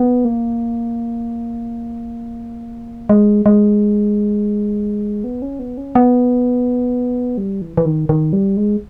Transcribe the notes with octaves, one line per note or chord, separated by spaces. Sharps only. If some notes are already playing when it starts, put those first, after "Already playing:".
Already playing: B3
A#3
G#3
G#3
B3
C#4
B3
C#4
B3
G3
E3
E3
D#3
D#3
G3
G#3